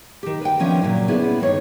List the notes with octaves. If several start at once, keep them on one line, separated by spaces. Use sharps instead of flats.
D#3 G4
B4 G5
D#3 F3 B3 C#4 D4 E5
A#2 C#3 F#3 F#4
D3 B3 C#4 E4 G#4
G2 D#3 C#5